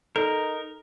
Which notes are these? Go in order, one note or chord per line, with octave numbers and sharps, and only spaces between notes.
D#4 A4 A#4